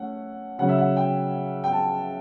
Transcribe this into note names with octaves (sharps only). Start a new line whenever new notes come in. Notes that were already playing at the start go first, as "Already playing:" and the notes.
Already playing: A3 C#4 F#5
C#3 F#3 C#4 F#5
E5
F#5
G5
G5
A5